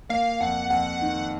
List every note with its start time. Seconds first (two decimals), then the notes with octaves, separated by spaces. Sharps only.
0.09 A#3 F5
0.40 F2 F#5
0.70 F2 F#5
1.01 D#3